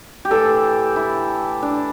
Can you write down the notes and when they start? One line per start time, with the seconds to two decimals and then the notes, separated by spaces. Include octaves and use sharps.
0.25 G4
0.31 A2 E3 A3 A4
0.96 E4
1.63 D4